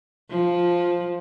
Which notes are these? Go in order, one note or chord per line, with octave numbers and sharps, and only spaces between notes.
F3